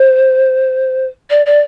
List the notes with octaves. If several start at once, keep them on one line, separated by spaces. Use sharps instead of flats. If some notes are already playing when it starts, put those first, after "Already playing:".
Already playing: C5
D5
D5